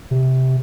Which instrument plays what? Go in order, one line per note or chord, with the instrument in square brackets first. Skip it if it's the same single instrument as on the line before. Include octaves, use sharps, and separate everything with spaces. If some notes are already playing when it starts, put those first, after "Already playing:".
[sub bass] C3